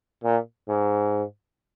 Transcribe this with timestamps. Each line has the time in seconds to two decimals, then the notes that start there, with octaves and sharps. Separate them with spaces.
0.24 A#2
0.69 G#2